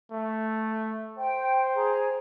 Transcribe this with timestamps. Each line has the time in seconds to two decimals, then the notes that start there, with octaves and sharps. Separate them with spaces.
0.12 A3
1.18 C5 G5
1.74 G#4 A#5